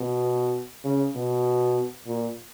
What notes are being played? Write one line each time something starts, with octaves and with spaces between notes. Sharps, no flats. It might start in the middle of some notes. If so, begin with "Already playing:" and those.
Already playing: B2
C#3
B2
A#2